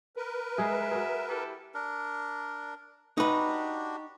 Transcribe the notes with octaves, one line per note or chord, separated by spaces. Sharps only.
A#4 B4
G#3 G#4 E5
F#4 G#4
E4 G4 A4
D4 A#4
D4 D#4 F#4 G4 B4